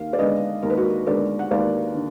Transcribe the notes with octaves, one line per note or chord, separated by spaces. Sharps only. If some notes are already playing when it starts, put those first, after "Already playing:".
Already playing: D#2 F5
D5
D3 G#3 B3 B4 D#5
D#2 A#4
B4
F#4 A#4
D3 G#3 B3 A#4 D5
F#5
D#2 D5 F5
D3